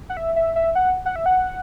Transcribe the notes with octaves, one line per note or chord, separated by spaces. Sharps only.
F#5
E5
E5
E5
F#5
F#5
E5
F#5